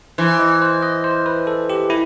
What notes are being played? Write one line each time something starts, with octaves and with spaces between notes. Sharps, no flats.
E3 C5
D#5
C5
D#5
C5
B4
A4
G4
E4